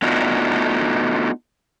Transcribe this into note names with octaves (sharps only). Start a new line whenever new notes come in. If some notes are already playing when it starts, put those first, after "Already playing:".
A3 B3 D4 D#4 F4 F#4